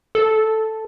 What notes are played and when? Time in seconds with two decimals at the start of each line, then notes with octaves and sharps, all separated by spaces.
0.15 A4